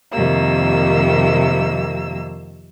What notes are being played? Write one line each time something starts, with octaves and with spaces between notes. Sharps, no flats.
F2 C3 D#3 G3 A#3 E6